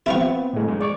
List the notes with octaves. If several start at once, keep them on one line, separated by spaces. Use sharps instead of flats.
B3 C4 E4 F4 C#6
A2 G#3
F#2 G#3
D5 C#6 D6